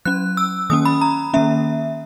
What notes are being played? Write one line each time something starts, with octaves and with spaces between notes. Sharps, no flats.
F#3 C#4 F#6
E6
D#3 A#3 C#4 D#6
B5
A#5
D#3 A#3 C#4 E5